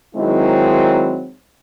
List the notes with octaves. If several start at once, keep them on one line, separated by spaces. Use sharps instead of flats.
D#3 F#3 G#3 C4 D#4 E4